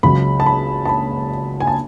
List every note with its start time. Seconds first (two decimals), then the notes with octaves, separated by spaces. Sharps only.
0.03 C#2 C#3 F#3 B5
0.40 A5
0.46 B5
0.85 A5
0.89 B5
1.60 G#5
1.67 A5